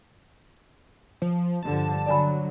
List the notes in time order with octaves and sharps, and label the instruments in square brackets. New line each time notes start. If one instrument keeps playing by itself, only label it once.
[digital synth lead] F3
[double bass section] G2 D3 F3 [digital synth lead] A5
[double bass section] D3 F#3 [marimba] D5 G#5 B5